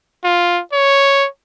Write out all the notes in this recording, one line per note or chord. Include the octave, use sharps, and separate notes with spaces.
F4
C#5